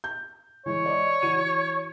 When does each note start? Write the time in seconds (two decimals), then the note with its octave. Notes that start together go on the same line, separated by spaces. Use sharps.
0.04 G6
0.66 E3 G#3 C#5
0.86 D5 D#5
1.22 E3 F#4 D#7